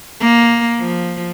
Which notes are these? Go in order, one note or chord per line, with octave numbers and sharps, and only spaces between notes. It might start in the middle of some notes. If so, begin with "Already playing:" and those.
A#3
F3